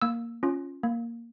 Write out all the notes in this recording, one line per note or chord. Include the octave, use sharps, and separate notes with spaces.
A#3 E6
C#4 F4
A#3